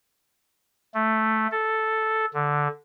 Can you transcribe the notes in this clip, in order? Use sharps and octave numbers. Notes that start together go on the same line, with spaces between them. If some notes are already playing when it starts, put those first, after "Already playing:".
A3
A4
D3